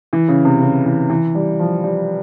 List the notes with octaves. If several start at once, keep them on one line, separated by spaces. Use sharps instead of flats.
E3
C#3
C3
C#3
E3
E3
G3
F3
G3